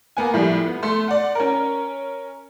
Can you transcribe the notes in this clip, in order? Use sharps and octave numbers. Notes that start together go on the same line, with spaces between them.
A#3 B3 G#5
A2 F3 G3
B3
A3 C6
D5 F#5
C#4 A#4